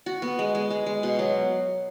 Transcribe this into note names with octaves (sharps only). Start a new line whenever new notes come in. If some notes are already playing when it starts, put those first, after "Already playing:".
F#4
B3
G#3
G#3
G#3
G#3
B2
F#3